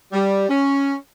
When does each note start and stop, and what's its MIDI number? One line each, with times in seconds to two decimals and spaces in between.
0.12 0.49 55
0.49 0.93 61